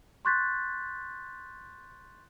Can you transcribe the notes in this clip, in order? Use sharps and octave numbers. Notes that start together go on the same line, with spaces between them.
C6 C#6 F#6 G6 A6 B6